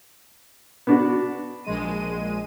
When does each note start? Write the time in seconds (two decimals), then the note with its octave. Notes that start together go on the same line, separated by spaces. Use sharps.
0.87 B3 D4 F#4
1.64 A#1 G#3 D#7